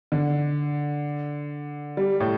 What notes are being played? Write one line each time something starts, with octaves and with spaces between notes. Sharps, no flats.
D3
G3
A2